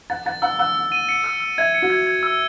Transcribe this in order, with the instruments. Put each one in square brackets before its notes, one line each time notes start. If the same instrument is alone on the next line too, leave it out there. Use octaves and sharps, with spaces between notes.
[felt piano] F#5 [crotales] A6
[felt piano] F#5 [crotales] A6
[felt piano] F#5 [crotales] E6
[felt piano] F#5 [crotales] E6
[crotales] E6
D#7
C#7
E6
E6
[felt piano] E5 [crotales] G#6
[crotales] C#7
[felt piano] F#4
[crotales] G#6
G#6
E6